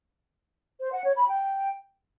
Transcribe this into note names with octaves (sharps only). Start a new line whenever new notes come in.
C5
F#5
C#5
B5
G5